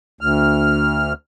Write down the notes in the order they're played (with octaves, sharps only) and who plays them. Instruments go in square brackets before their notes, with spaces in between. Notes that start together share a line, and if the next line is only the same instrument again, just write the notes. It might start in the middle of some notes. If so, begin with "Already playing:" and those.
[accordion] D2 F6